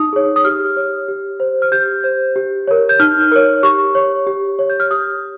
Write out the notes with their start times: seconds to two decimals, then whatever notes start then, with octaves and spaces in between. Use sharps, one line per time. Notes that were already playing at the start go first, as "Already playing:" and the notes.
Already playing: D#4 D#6
0.13 G#4 C#5
0.36 D#6
0.44 G4 F6
0.77 C#5
1.08 G4
1.40 C5
1.62 F6
1.72 G4 G6
2.04 C5
2.36 G4
2.68 A#4 C#5
2.89 G6
2.99 D#4 F6
3.32 A#4 C#5
3.63 G4 C#6
3.95 C#5
4.27 G4
4.59 C#5
4.70 G6
4.80 F6
4.91 G4 D#6